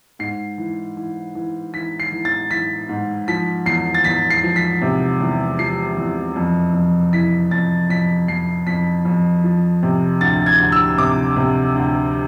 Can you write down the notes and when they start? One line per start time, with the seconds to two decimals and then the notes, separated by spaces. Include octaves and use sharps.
0.19 G#2 C7
0.58 E3
0.97 E3
1.35 E3
1.74 E3 B6
2.00 C7
2.12 E3
2.25 A6
2.51 E3 B6
2.89 G#2
3.28 F3 B6
3.66 E2 C7
3.94 A6
4.04 E2 B6
4.30 C7
4.43 F3
4.56 B6
4.82 C3
5.20 E2
5.59 F3 C7
5.97 E2
6.36 F2
6.74 F2
7.13 E3 B6
7.51 F2 A6
7.90 F2 B6
8.28 F2 C7
8.67 F2 B6
9.05 F2
9.44 F3
9.83 C3
10.21 D2 A6
10.46 G#6
10.59 D2
10.72 E6
10.98 C3 D6
11.36 C3
11.75 D2